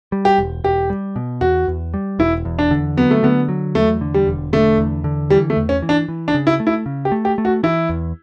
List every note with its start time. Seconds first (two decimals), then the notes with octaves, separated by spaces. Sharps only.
0.12 G3
0.25 G4
0.38 E1
0.64 E1 G4
0.90 G3
1.16 B2
1.41 E2 F#4
1.68 E2
1.94 G3
2.19 E1 E4
2.45 E2
2.59 D4
2.71 D3
2.97 F#3 B3
3.11 A3
3.23 D3 B3
3.49 F#3
3.75 E2 A3
4.01 D3
4.14 G3
4.27 E1
4.53 D3 A3
4.78 E2
5.04 D3
5.30 E3 G3
5.50 A3
5.56 E2
5.69 C#4
5.82 E3
5.89 D4
6.08 E3
6.28 D4
6.34 C#3
6.47 E4
6.60 A3
6.67 E4
6.86 C#3
7.05 G4
7.12 A3
7.25 G4
7.38 A3
7.45 F#4
7.63 E3 E4
7.89 E2